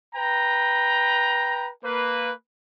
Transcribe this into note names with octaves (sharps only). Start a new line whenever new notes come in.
B4 G5 A#5
A#3 B4